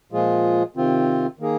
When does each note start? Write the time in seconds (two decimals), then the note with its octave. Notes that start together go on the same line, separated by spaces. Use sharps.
0.12 A#2 F3 G#3 F4 G#4
0.76 C3 D#3 C4 F4
1.39 D#3 A#3 G#4